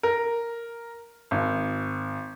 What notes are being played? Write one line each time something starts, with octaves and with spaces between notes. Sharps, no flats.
A#4
G#1